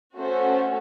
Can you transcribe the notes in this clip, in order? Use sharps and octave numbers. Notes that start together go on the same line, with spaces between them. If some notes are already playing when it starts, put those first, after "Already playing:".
A3 C#4 F#4 A4 C5